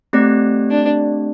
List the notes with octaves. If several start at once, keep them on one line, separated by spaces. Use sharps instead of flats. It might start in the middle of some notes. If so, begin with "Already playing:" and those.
A3 C4 G4 D5
D4